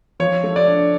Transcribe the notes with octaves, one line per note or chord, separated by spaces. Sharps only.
F3 C#5
A3
D5
D4